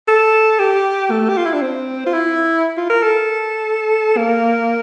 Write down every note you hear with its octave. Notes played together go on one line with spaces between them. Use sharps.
A4
G4
A3
G4
F4
E4
D4
C4
F4
E4
F4
A#4
A4
A#3